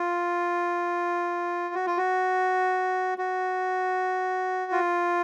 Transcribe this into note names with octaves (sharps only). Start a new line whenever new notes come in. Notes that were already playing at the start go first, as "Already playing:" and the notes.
Already playing: F4
F#4
F4
F#4
F#4
F4